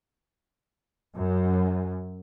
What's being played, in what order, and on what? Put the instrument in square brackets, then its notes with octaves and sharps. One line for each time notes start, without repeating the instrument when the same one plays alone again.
[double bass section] F#2